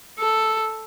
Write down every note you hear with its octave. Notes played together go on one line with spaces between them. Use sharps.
A4